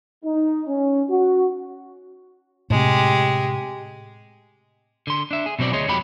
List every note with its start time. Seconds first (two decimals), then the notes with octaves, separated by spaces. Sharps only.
0.24 D#4
0.67 C#4
1.09 F#4
2.70 A2 C3 G#3 G4
5.07 D3 C6
5.31 D4 E5
5.46 G#4
5.59 B2 F#3 C4 D5
5.73 D2 G#4 C#5 D#5 C6
5.88 F2 F3 F#3 G#3 G4 B5